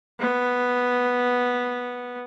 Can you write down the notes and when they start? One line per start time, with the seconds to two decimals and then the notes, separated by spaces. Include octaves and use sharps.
0.20 B3